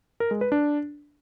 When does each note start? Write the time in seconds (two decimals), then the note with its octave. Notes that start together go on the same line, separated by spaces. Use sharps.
0.20 A#4
0.31 G#3
0.41 B4
0.52 D4